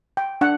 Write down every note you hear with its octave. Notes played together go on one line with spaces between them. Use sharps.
G5
D4 F#5